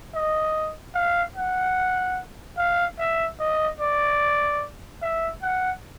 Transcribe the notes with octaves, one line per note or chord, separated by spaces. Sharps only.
D#5
F5
F#5
F5
E5
D#5
D5
E5
F#5